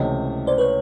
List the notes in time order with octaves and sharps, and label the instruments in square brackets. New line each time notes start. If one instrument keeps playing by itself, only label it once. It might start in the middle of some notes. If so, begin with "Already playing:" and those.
Already playing: [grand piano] C#2 C3 E3 A3 [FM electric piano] C#5 D#5
[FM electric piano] C5 D5
B4 C#5